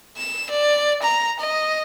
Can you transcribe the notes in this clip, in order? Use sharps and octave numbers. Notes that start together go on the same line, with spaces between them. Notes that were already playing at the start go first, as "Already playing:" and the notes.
E7
D5
A#5
D#5